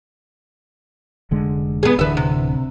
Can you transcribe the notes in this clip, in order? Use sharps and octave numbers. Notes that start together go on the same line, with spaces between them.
F1 D3 G#3
B3 G#4
D1 D3 E3 B4 E5
C3